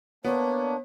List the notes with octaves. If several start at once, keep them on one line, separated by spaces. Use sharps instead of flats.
A#3 B3 D4 C#5